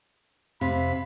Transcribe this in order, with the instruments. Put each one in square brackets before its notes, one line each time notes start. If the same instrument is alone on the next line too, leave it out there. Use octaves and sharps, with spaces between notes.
[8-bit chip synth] F2 C4 F5 [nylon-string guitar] C3 [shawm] B5